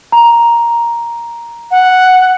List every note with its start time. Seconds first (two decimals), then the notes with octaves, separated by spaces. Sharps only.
0.12 A#5
1.71 F#5